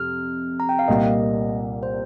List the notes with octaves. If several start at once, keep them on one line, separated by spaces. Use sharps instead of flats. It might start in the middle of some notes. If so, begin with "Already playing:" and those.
Already playing: F2 C3 F6
A#5
G5
F5
C2 A#2 A#3 G4 D#5
C5